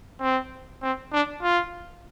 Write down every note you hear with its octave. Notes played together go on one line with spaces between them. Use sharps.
C4
C4
D4
F4